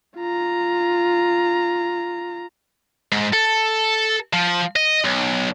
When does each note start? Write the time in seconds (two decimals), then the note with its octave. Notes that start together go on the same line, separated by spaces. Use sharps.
0.17 F4 A#5
3.12 G#2
3.33 A4
4.33 F3
4.76 D#5
5.04 B1